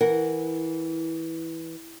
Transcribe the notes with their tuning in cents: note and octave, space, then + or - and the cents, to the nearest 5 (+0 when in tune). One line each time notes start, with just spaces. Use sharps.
E3 -10 A#4 -5 F#5 +0